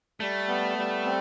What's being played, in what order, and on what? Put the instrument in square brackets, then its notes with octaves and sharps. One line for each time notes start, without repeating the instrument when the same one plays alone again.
[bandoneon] G3 [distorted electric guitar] A3
[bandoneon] B3
G3
C4